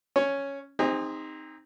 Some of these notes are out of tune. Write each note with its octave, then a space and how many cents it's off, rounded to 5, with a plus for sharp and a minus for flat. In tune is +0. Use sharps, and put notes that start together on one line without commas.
C#4 +0 C#5 +0
C4 +0 D#4 +0 G#4 -40